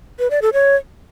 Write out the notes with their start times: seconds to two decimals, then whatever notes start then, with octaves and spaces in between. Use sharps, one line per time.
0.19 B4
0.31 D5
0.42 A4
0.53 C#5